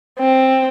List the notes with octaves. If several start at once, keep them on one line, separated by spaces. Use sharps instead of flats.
C4